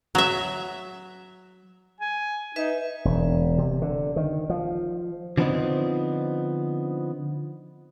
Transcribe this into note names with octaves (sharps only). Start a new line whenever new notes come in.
F#3 E5
G#5
D#4 B4 E5
E1
C3
D3
D#3
F3
D3 F3 A3 B3 C4 D#4